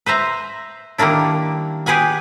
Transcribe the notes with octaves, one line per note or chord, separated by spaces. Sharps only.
B4 C5 E5 A#5
D#3 G3 A#3 D4 E4
G4 G#4 B4 F#5 G#5